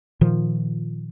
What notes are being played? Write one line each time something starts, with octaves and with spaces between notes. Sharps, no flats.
A#2 D#3 F3